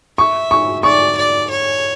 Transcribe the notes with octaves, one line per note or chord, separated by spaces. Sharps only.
E5 C#6
C#6
D5 C#6
D5
C#5